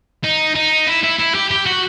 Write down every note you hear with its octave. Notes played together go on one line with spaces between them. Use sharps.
D#4
D#4
E4
E4
E4
G4
G4
F#4